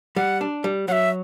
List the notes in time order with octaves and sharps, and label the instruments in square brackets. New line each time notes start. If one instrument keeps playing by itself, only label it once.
[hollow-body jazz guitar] G3 [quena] F#5
[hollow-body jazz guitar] D4
G3
[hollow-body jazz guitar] F#3 [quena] E5 F#5